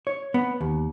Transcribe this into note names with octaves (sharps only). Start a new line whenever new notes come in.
C#5
B3
D#2